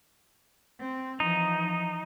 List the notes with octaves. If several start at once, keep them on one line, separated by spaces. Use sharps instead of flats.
C4
E3 F3 D#4